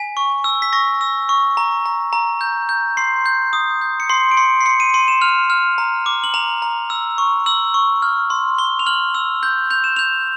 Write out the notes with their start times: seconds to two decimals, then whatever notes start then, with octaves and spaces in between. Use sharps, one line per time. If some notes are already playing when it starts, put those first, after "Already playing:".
Already playing: G#5 B6
0.17 C#6
0.44 E6
0.62 B6
0.73 C#6 A#6
1.01 E6
1.29 C#6
1.57 A#5
1.86 A#5
2.13 A#5
2.41 G6
2.69 G6
2.97 C6 C7
3.26 G6
3.53 D#6
3.81 G6
4.00 C#7
4.09 C6 C7
4.31 D7
4.37 C6 C#7
4.61 C7
4.66 C6 C#7
4.80 D#7
4.94 C6 D#7
5.08 E7
5.21 F6 F7
5.50 F6
5.78 A#5
6.06 D6
6.24 F#7
6.34 A#5 F7
6.62 A#5
6.90 E6
7.18 C#6
7.46 E6 F#7
7.74 C#6
8.02 F6
8.30 C6
8.58 C6 G7
8.79 F7
8.86 F6 F#7
9.15 E6
9.43 G6
9.70 G6 F7
9.84 E7
9.96 G6 F7